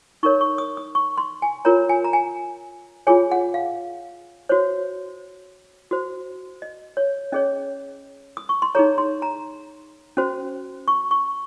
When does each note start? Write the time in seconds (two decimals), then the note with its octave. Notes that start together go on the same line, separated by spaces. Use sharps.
0.23 D#4 A#4 C#5 C#6
0.41 C#6
0.58 D#6
0.77 D#6
0.95 C#6
1.17 C6
1.42 G#5
1.65 F4 A#4 C#5 A#5
1.89 G#5
2.04 A#5
2.13 G#5
3.07 F4 G#4 C#5 G#5
3.32 F#5
3.54 F5
4.49 F#4 C5 C#5
5.91 F#4 C5
6.62 D#5
6.97 C#5
7.32 C#4 G#4 C#5 D#5
8.37 D#6
8.49 C#6
8.62 C6
8.75 D#4 G#4 C#5 A#5
8.98 C6
9.22 A#5
10.17 C#4 F#4 C5
10.88 C#6
11.11 C#6